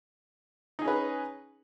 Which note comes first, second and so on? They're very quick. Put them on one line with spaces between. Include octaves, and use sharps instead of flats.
D#4 G#4 C#4 B4